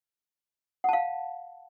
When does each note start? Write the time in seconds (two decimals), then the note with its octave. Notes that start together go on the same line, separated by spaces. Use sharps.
0.84 F#5
0.89 A5
0.93 F5